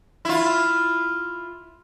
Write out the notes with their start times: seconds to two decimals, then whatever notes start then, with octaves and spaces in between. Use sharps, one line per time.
0.25 E4 F4